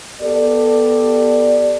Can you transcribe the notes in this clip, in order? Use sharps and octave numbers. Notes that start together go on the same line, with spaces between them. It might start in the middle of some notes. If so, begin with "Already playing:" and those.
B3 G4 A4 D5